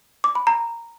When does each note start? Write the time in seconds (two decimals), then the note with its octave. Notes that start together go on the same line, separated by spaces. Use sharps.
0.24 D6
0.35 B5
0.47 A#5